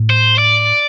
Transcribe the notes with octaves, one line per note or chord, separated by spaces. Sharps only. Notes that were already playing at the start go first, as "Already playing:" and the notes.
Already playing: A2
C5
D5